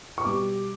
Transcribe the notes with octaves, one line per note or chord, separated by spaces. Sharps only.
C#6
B2 G3 B3 D6